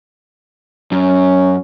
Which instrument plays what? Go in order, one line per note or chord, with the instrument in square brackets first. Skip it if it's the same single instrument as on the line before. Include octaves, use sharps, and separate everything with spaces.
[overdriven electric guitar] F#2 [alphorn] C#4